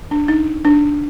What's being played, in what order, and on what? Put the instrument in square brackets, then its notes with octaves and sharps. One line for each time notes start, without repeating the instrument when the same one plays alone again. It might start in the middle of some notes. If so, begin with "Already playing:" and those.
[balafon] D4
D#4
D4